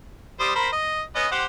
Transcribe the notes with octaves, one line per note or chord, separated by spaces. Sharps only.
G3 C5 D#6
A#4 C5 B5
D#5
B3 C#4 D#5
G4 C5 F#5